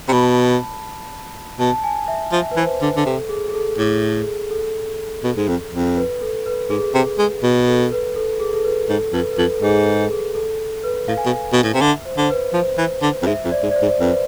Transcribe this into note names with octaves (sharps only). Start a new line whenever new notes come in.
C3 B5
B2 A5
B2 A5
G#5
E5
F3 E5
B4
E3 C5
D3 B4
D3
C3 A4
G#4
G#4
A4
A2 G#4
A4
B2
G#2
F2
F2
B4
A4
B4
G#2 G#4
C3 G#4
G#3
B2
A4
B4
A4
G#4
A4
B4
G#2 A4
F2 B4
B4
F2 A4
A4
G#2 G#4
A4
G#4
A4
B4
A2 F5
G#5
B2 F5
B2
A2
C3
D3 E5
C5
D3 C5
B4
F3 C5
E3
D3
F2
G#2 E5
F2 C5
D5
G#2
D5
C5
G#2
F2 B4
C5